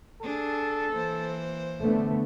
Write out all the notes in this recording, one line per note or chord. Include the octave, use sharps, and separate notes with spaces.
D4 G#4 A4
E3 A#3 C5
D3 A3 B3